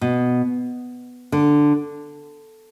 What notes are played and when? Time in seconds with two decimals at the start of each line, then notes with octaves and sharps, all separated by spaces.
0.01 B2
1.32 D3